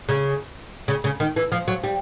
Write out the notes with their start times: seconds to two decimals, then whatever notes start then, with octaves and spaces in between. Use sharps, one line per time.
0.09 C#3
0.88 C#3
1.04 C#3
1.20 D#3
1.36 E3
1.52 F3
1.68 F#3
1.84 G3